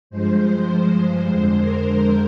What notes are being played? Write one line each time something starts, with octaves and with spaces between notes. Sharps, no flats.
G2 F3 G#3 C5
C5
C5
F2 D3 G#3
A#4
C5